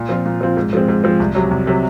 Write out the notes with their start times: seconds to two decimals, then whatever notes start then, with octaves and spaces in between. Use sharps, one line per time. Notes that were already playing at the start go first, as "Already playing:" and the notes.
Already playing: A#2
0.09 F3 C4 F4
0.26 A#2
0.41 F3 C4 F4
0.57 G#2
0.73 F3 G#3 C4
0.88 G#2
1.04 F3 G#3 C4
1.20 C2
1.35 C3 F#3
1.51 C2
1.67 C3 F#3